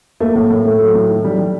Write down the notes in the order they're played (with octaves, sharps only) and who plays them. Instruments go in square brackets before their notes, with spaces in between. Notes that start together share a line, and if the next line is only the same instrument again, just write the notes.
[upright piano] A3 [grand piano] A#3
[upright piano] A2
A2
[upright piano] A2 [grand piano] A3
[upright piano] F#3
A2
D#3
G3
G3